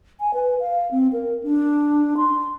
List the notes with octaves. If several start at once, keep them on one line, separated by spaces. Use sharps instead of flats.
G#5
B4
F5
C4
A#4
D4
C6